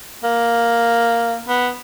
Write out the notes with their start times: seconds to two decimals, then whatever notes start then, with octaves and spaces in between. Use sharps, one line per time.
0.24 A#3
1.48 B3